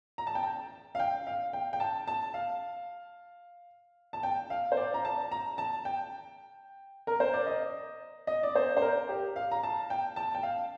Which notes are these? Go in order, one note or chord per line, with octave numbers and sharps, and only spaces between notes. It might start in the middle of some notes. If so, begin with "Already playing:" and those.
A#5
A5
G5
A5
F5
G5
F5
G5
G5
A5
A5
F5
A5
G5
F5
C5
D5
A#5
A5
A#5
A5
G5
A#4
C5
D5
D#5
D#5
D5
C5
C5
A#4
G4
F5
A#5
A5
G5
A5
G5
F5